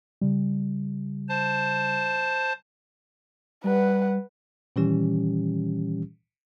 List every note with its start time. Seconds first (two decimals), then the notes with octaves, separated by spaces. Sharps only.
0.21 C#3 G3
1.29 C5 A5
3.64 G3 B4 F#5
4.76 A#2 D#3 E3 G3 C#4 G4